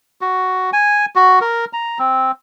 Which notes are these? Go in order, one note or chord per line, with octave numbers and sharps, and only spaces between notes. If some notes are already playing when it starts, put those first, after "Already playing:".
F#4
G#5
F#4
A#4
A#5
C4